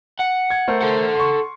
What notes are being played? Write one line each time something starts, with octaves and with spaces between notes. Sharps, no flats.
F#5
G#6
A3 A#4 C5
A4 F#5
C6 C#6